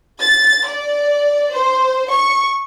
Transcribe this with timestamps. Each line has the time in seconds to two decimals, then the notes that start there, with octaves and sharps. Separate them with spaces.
0.20 A6
0.66 D5
1.53 C5
2.10 C#6